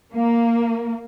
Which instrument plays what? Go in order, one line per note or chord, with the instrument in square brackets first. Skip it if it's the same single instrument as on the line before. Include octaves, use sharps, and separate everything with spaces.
[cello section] A#3